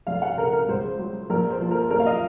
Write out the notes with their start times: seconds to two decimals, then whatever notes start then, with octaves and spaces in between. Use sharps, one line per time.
0.07 F1 F5
0.22 F#5
0.38 C#3 A#4
0.53 A#4
0.68 C#2 C5
0.99 F#3
1.30 A#1 A#4
1.50 C5
1.61 F3
1.71 A#4
1.90 F#1 A#4
2.00 F5
2.06 D#5